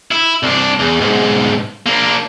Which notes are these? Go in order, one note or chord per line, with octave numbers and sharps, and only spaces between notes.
E4
C2 D4
E2
B1 G#2
A#3 D4